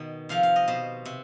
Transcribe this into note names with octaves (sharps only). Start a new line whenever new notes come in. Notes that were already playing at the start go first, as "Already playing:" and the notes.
Already playing: B2 D#3
C3 F3 F5
F5
D#5
B2 C5
C3